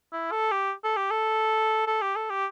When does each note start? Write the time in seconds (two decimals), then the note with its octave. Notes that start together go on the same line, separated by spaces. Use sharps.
0.13 E4
0.32 A4
0.52 G4
0.84 A4
0.97 G4
1.11 A4
1.87 A4
2.02 G4
2.16 A4
2.30 G4